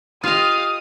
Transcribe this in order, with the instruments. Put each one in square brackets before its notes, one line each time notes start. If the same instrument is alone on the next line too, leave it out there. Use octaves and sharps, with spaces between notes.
[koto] F4 D#5 [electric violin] G4 F5 [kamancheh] D#6